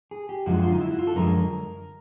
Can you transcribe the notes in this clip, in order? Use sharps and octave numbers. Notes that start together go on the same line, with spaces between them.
G#4
G4
F#2 D3 F3 G#3 F#4
F4
D#4
E4
F#4
F4
A4
F#2 D3 F3 G#3 A#4